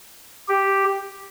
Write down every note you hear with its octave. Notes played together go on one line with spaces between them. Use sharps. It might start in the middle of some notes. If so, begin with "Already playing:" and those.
G4